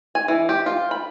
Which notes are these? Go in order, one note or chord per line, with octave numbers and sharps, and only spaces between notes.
G#5
E3
G4
F4
B5